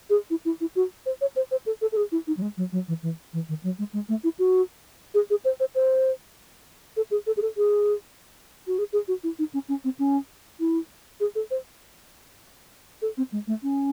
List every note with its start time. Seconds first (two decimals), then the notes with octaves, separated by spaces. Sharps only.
0.10 G#4
0.30 E4
0.45 E4
0.61 E4
0.75 F#4
1.06 C5
1.21 C#5
1.36 C5
1.51 C5
1.66 A4
1.82 A4
1.92 A4
1.97 G#4
2.12 E4
2.27 D#4
2.37 F#3
2.42 G#3
2.57 F#3
2.72 F#3
2.88 E3
3.03 E3
3.33 E3
3.49 D#3
3.63 F#3
3.79 G#3
3.93 G#3
4.09 A3
4.24 E4
4.39 F#4
5.14 G#4
5.30 G#4
5.45 C5
5.60 C5
5.75 C5
6.97 A4
7.11 G#4
7.27 A4
7.37 G#4
7.42 A4
7.57 G#4
8.67 F#4
8.78 G#4
8.93 G#4
9.08 F#4
9.23 E4
9.39 D#4
9.54 C#4
9.69 C#4
9.84 C4
9.99 C#4
10.60 E4
11.20 G#4
11.35 A4
11.51 C5
13.02 A4
13.17 C4
13.32 G#3
13.47 A3
13.63 C#4